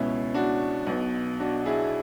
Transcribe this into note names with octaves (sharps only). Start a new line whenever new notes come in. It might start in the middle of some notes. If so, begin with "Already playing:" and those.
Already playing: C#2 B2 C#4 E4
D4 F#4
B1 B2
D4 F#4
E4 G#4